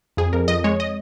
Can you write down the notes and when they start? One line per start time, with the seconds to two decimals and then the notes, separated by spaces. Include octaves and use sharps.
0.17 F2 G#4
0.33 F2 A#4
0.48 F2 D#5
0.64 G#3 C#5
0.80 D#5